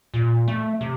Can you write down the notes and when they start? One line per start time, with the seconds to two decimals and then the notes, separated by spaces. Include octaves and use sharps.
0.14 A#2
0.48 A3
0.81 C3